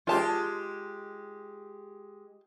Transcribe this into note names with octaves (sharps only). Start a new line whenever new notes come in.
G#3 F4 G4 A5